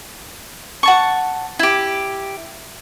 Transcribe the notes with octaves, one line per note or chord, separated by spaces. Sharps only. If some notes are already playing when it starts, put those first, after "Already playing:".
F#5 A5 C#6
E4 G4